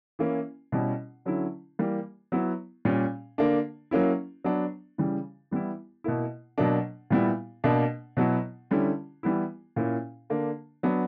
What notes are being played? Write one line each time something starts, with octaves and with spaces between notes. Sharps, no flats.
E3 A#3 C#4 E4
B2 G3 C#4 E4
D3 F#3 C#4 E4
E3 G3 A#3
F#3 B3 E4
A#2 G3 C#4
D3 A#3 D4
F#3 A#3 C#4 E4
F#3 B3 D4
C#3 E3 G3
E3 G3 B3 E4
B2 A#3 E4
B2 F#3 A#3 D4
A#2 G3 B3 E4
B2 A#3 D4
B2 F#3 B3 E4
D3 G3 C#4 E4
E3 G3 B3 E4
A#2 A#3 C#4 E4
D3 A#3 D4
F#3 B3 D4